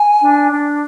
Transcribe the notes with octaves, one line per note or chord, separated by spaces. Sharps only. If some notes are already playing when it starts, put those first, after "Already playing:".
Already playing: G#5
D4
D4